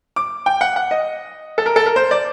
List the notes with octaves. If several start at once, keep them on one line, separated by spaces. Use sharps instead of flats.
D6
G5
F#5
F#5
D#5
A4
A#4
A4
A#4
C5
D5